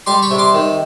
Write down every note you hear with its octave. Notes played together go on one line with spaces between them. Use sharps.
G3 C6 D6
B5 C#6
C3
C6 D6
D#3